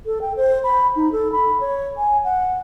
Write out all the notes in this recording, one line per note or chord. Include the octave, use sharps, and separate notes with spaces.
A4
G5
C5
B5
D#4
A4
B5
C#5
G#5
F#5